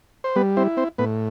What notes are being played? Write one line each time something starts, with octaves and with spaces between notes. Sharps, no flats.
C5
G3 B3 B4
C4 E4 C5
C4 C5
A2 B3 B4